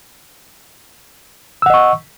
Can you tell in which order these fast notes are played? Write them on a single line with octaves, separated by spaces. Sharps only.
E6 F#5 D#5 C#6